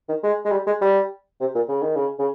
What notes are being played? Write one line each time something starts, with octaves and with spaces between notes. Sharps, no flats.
D#3
G#3
G#3
G3
G#3
G3
C3
A#2
C#3
D#3
C#3
C#3